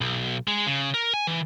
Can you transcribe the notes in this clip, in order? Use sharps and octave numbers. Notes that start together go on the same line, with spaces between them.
B1
G#3
C#3
A#4
G#5
E3